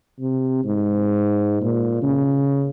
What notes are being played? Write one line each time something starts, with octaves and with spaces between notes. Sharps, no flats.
C3
G#2
A#2
C#3